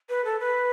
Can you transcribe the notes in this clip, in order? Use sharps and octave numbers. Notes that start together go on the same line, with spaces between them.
B4
A4
B4